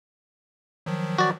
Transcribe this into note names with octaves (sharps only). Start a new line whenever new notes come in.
D#3 F3 F#3
F#4 D5